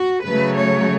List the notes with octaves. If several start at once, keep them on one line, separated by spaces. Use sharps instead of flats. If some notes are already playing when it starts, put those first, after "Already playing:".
Already playing: F#4
C#3 F#3 A3 B4
C#5